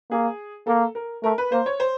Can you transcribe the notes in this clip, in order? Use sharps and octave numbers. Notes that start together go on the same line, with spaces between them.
A#3 G#4
A#3 A4
A#4
A3 A#4
B4
A#3 C5
C#5
C5